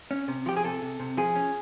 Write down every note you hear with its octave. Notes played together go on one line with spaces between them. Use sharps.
C#4
C3
F3 G4
G#4
C3 A4
C3
C3
F3 G#4
C#4